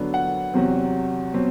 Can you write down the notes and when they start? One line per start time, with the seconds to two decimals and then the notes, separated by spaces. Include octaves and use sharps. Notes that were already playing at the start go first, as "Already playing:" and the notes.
Already playing: D3 F#3 B3 D4
0.14 F#5
0.53 E2 C3 F#3 C4
1.34 B2 F#3 C4